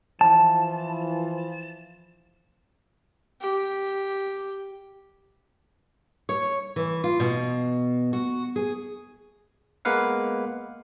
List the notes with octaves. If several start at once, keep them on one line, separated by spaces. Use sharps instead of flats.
E3 F3 A5
G4
C#5
E3
F4
B2
F#4
G#4
G#3 A#3 B3 B4 F5 F#5